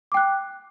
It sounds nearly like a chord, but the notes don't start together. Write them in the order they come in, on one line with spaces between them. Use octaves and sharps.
D6 G5 F#6